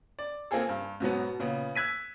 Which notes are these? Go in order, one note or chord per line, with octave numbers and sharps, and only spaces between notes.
D5
A#3 C4 F4 G#4 A4
G2
G#2 B2 F#3 B3
A#2 C#3 B3
E6 F#6 G#6 B6 D#7